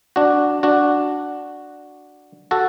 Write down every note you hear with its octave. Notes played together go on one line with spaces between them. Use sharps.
D4 F#4
D4 F#4
F#4 A4